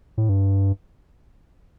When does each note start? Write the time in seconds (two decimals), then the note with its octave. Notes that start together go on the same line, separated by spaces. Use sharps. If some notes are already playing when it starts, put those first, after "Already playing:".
0.18 A2
0.29 G2